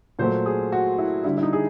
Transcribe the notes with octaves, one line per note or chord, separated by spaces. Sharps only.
A#2 F#3 A3 C5
G#4
F#4
E4
D3 G3 E4
E4
D#4
G#4